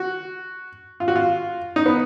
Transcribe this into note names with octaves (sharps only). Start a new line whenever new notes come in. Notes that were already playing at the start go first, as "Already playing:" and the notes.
Already playing: F#4
F4
F#4
F4
D#4
B3